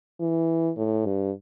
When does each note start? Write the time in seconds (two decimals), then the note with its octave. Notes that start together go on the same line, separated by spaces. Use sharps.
0.20 E3
0.77 A2
1.06 G2